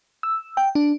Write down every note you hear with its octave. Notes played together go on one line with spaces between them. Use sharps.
E6
G5
D4